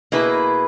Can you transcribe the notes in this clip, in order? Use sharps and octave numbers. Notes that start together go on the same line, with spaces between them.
B2 A#3 E4 G#4 B4